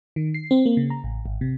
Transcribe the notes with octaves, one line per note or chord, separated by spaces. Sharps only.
D#3
C7
C4
A#3
C#3
A#5
A1
G#1
C3